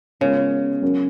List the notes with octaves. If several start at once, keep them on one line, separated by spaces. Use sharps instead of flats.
C#3 G#3 B3 F4 A#4
F#3 C#4 F#4 A#4